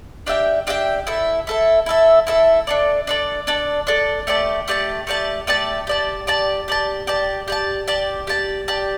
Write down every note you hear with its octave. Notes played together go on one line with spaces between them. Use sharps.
D4 G4 E5 G5
D4 G4 E5 G5
E4 A4 E5
E4 A4 E5
E4 A4 E5
E4 A4 E5
D4 A4 D5
D4 A4 D5
D4 A4 D5
D4 A4 D5
A3 G4 D5 A5
A3 G4 D5 A5
A3 G4 D5 A5
A3 G4 D5 A5
G4 D5 A5
G4 D5 A5
G4 D5 A5
G4 D5 A5
G4 D5 A5
G4 D5 A5
G4 D5 A5
G4 D5 A5